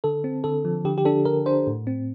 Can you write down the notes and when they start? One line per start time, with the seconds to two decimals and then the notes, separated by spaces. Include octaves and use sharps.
0.04 D3 A4
0.24 C4
0.44 D3 A4
0.65 F3
0.85 D3 G4
0.98 G4
1.05 D4 A4
1.25 D3 A#4
1.46 D4 C5
1.67 A2
1.87 C4